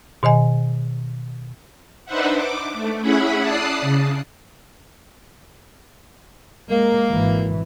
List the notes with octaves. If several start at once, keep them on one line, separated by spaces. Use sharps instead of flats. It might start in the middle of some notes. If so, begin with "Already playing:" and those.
B2 D#3 D#5 G#5
D4 D#4 B4 C5 E5 F#5
D6
A3
C#4 E4 G#4 E5 F#5 B5
D5 A5 D#6 F#6 C7
C#3
G#3 A#3
G#1 E3